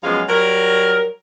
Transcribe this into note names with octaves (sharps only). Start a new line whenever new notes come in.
F#2 F3 G#3 B3 F5
F#3 G3 A#4